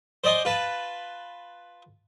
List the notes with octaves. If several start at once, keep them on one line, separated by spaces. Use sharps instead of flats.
C5 D5 D#5 G#5 C6
F4 B4 A5